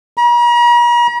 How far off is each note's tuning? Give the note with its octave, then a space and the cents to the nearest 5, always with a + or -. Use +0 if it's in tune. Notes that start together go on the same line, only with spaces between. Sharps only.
A#5 +45